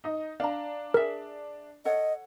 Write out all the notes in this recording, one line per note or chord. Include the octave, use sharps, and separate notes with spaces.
D#4 D#5
D4 F5 A#5
G#4 A#4 E5
A4 C#5 D#5 F#5